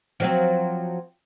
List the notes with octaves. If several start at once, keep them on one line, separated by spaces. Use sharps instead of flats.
F3 F#3 C4